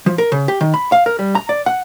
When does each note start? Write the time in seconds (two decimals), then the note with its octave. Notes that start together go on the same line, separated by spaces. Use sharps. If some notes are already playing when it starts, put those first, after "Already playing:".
0.06 F3
0.18 A#4
0.32 C#3
0.48 G4
0.61 D#3
0.74 B5
0.92 F5
1.06 A#4
1.19 G3
1.35 A#5
1.49 D5
1.66 F#5